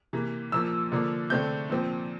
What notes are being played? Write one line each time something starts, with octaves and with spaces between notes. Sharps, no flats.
C3 E3 A#3
A#2 F3 A#3 E6
D3 F3 A#3
D3 A3 C4 G6
A#2 F3 C4